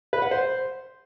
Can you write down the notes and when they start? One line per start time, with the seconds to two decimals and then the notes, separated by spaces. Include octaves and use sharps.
0.13 B4
0.22 F#5
0.31 C5